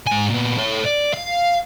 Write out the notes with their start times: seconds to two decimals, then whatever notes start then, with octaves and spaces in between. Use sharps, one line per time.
0.07 G#2 G#5
0.29 A#2 B3
0.58 A4 C#5
0.85 D5
1.13 F5